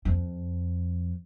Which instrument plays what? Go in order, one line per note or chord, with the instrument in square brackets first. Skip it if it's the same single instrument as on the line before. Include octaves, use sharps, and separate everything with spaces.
[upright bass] F2